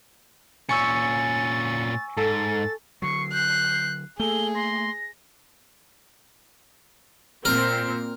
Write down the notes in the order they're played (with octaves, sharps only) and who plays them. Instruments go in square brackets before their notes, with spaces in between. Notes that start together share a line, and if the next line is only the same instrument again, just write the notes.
[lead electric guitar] A#2 C#4 [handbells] G#5 C#6 E6 [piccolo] A6 [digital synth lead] C#7
[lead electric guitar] G#2 [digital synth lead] A4 [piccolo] A6
[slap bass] D3 F#3 [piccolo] C#6 [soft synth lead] C7
[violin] F#6 [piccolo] G6
[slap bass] A3 A#3 [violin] G#4 [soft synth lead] A4 [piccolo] G7
[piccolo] C6 [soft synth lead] A#6
[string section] A#2 C4 [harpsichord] A#4